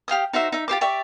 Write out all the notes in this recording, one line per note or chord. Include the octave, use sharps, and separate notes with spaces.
G4 F5 G5 D#6
D#4 F#4 C5 E5
D#4 E5
F4 G4 C5 D6
G4 D5 E5 C#6